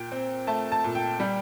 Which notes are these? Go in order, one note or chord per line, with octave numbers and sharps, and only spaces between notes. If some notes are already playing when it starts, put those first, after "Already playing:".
Already playing: A#2 G5
C4
A3 A5
A5
A#2
G5
G3